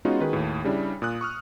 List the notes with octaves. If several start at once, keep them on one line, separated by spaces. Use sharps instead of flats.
G#3 B3 C#4 D#4 F4 F#4
D#3 F#4 G#4 B4
D#2 A2
C#3 G3 D4 E4
A#2 D#6 F#6
C#6 D#6 F6